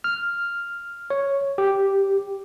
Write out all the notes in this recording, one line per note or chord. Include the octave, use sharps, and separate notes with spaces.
F6
C#5
G4